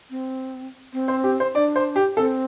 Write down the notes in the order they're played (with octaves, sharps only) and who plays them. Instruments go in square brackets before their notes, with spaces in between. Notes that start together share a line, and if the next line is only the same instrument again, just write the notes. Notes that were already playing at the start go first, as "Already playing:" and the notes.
[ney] C4
C4
[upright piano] C5
G4
C5
[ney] D4 [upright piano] D5
[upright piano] C5
G4
[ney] C4 [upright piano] A4